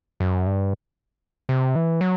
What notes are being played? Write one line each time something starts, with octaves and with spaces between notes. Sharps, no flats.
F#2
G2
C3
E3
F#3